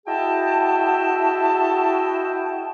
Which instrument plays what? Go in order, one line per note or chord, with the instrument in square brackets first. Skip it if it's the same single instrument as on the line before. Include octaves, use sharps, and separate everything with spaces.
[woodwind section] E4 F#4 G#4 D#5 G5 A5